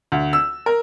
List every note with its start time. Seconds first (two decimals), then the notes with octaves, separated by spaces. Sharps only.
0.12 D2
0.33 E6
0.66 A#4